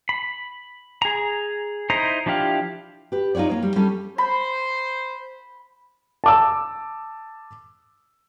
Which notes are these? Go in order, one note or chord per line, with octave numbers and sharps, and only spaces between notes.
B5
G#4 A#5
D#4 E4 C5 A#5
F3 D4 E4 G4 F5
G4 B4
D#4 F4 F#4 C#5 D5
A#3 C#5
G3
G3 C#4 G4 A4
C5 B5
A5 D6 E6